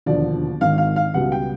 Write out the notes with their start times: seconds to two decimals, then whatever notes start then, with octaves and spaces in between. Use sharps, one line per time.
0.06 E1 D#2 D3 F3 D5
0.61 G#1 G#2 D#3 F5
0.78 F5
0.96 F5
1.14 C#2 B2 G3 F#5
1.32 G5